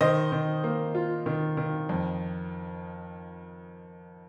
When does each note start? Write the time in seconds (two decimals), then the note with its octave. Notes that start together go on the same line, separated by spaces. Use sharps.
0.01 D#3 C5 D#5
0.32 D#3
0.64 A#3
0.95 F4
1.26 D#3
1.57 D#3
1.89 F2